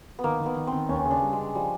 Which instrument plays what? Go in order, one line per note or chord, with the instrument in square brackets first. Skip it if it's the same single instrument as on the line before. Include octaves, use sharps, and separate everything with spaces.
[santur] B3
[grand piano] D#3 [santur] A#3
[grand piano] D#3
[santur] B3
[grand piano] D#3
[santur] C4
[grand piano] D#3
[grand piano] D#2 [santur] C#4
[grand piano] C#3
[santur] D4
[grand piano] G3
[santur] G#3
[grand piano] C#3
[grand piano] F3 [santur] G3